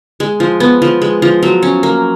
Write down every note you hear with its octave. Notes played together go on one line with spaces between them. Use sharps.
G#3
F3
B3
F3
G#3
F3
F#3
C#4
A#3